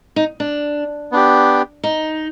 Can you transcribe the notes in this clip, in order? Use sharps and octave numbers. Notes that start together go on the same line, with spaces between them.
D#4
D4
B3 D4 G4
D#4